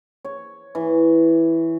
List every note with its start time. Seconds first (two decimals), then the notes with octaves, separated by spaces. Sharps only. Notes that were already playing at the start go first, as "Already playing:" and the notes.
0.25 C#5
0.75 E3